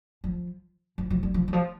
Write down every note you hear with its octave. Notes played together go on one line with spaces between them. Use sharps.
F3
F3
F3
G3
F3
D#3
F3